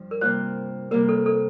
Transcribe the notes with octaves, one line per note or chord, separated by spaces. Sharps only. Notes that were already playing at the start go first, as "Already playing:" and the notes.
Already playing: G2 F3
A#4
C3 G3 A#3 F4 C5
C3 G3 A#3 F4 A#4
A4
A4